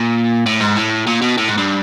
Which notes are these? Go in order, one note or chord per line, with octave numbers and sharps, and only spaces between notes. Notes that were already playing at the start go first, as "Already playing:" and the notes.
Already playing: A#2
A2
G#2
A2
A#2
B2
A2
G#2
G2